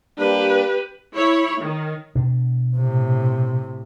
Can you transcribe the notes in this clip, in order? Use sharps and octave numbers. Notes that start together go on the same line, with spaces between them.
G3 A#3 D4 G4 B4
E4 C#5
D#3
B2 D4
A2 C3